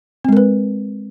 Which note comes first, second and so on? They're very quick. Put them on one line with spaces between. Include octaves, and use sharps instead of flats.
C4 G#3 A#4 B4